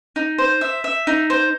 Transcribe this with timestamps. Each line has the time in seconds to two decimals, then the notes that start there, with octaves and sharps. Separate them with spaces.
0.16 D#4
0.38 C5
0.61 E5
0.84 E5
1.07 D#4
1.30 C5